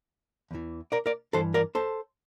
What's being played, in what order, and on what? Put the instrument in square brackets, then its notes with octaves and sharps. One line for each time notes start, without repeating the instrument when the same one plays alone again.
[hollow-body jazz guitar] E2 E3
A#4 D5
A#4 D5
G2 E3 A4 C5
A#4 D5
A4 C5